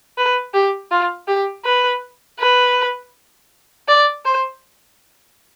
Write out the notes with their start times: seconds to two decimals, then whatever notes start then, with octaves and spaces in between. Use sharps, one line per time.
0.18 B4
0.54 G4
0.91 F4
1.28 G4
1.65 B4
2.40 B4
3.88 D5
4.25 C5